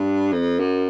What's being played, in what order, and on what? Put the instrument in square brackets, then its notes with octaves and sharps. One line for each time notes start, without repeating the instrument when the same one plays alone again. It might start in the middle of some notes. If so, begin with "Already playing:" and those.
Already playing: [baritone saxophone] G2
F2
F#2